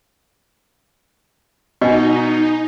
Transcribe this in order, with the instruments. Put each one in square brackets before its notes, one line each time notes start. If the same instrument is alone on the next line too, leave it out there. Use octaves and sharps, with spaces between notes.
[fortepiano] B2 [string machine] D#4 [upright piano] D#5 G#5